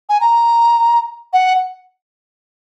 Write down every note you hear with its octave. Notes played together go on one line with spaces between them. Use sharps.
G#5
A#5
F#5